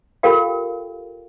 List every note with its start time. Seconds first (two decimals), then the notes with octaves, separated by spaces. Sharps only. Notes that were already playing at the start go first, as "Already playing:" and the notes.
0.23 F4 G4 A4 A#4 F5 G5